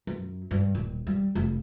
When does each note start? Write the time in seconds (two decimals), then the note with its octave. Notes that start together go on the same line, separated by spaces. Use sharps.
0.07 F#2
0.51 G2
0.75 D#1
1.07 G3
1.35 F1